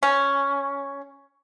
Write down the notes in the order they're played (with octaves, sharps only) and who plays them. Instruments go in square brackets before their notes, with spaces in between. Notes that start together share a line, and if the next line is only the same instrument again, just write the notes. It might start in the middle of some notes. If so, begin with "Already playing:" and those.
[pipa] C#4